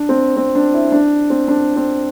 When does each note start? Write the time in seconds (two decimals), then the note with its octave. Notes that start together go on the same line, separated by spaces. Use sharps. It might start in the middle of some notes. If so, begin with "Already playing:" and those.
Already playing: D4
0.09 C4
0.37 C4
0.55 D4
0.74 E4
0.92 D4
1.30 C4
1.48 D4
1.76 C4